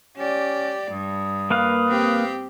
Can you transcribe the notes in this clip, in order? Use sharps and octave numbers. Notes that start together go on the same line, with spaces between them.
C#4 G4 D5
G2 D#6
A#3 B4 F5
C4 G4